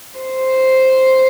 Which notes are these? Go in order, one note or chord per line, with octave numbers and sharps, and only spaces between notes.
C5